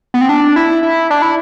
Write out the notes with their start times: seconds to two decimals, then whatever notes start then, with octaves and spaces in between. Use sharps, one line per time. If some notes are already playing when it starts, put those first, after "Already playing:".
0.14 B3
0.21 C4
0.29 D4
0.56 E4
0.83 E4
1.10 D4
1.22 E4